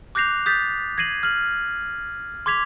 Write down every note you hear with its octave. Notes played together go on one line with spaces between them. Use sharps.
D6 F#6 G6 A#6 C7 F7
D#6 G6 A6 B6
G#6 A#6 C7 D#7 F#7
F6 F#7
C6 D6 G#6 B6 F7